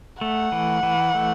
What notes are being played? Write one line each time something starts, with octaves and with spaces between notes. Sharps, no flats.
A3 F#5
E3
E3
A3